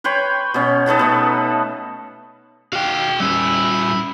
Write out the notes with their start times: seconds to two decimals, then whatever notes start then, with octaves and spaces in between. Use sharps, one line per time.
0.04 B4 C#5 G5 C6
0.54 B2 C#4
0.86 D#4 A4 B4 A5
0.99 B2 A3
2.73 D#3 F#4 F5 G5
3.20 G3 C#4 E4